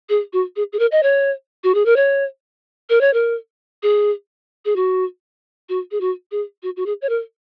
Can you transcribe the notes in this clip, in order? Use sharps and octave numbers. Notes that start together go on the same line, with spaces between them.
G#4
F#4
G#4
G#4
A#4
D#5
C#5
F#4
G#4
A#4
C#5
A#4
C#5
A#4
G#4
G#4
F#4
F#4
G#4
F#4
G#4
F#4
F#4
G#4
C#5
A#4